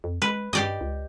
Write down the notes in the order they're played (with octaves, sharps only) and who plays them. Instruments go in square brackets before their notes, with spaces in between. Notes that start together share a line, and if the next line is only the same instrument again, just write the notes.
[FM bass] F2
[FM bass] G#3 [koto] B4
[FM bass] G2 [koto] G4 D5 D#5
[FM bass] C#2